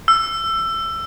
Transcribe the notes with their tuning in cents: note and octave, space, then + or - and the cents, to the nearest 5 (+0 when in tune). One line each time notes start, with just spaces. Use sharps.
E6 +20